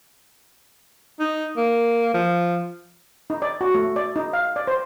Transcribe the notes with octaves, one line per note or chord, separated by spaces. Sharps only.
D#4
A#3
F3
D#4
D5
F#4
A3
D5
D#4
F5
D5
C5